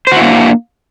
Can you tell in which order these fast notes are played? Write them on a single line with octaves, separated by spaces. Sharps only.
C5 F#4 E4 A#3 D4